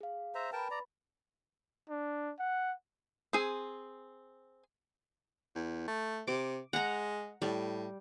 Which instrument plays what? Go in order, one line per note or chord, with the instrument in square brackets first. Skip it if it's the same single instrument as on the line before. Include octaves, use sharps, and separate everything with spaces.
[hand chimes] G#4 F5
[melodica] C5 E5 A#5
[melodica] A#4 G5 A5 [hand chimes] B4 B5
[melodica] D5 A#5
[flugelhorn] D4
F#5
[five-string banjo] C4 G#4 G#5
[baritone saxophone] E2
A3
[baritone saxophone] C3 [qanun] D6
[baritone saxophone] G#3 [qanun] F#5 A#5
[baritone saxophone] A2 [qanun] G3